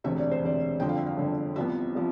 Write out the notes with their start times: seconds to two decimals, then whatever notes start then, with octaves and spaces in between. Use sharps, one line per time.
0.04 E1 D2 C3 E5
0.18 D5
0.31 C5
0.42 E1 D2 C3 D5
0.80 G1 F2 D3 G5
0.89 F5
0.98 E5
1.06 F5
1.18 G1 F2 D3
1.56 C2 C3 F3 B3 E5
1.95 C3 F3